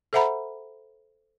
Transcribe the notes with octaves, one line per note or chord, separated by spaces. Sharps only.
A4 C5 E5 F#5 A#5 B5